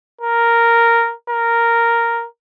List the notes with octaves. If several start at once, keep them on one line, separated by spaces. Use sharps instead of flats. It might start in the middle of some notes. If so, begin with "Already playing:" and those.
A#4
A#4